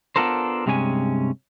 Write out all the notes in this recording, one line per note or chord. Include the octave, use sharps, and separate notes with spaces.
B3 D4 F4 A4 A#4 C5
G2 C3 G#3 C#4 G#5